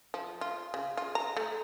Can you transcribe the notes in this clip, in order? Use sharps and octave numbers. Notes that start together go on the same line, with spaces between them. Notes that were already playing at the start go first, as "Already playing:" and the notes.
F3
F4
C#3
F4
A#5
A3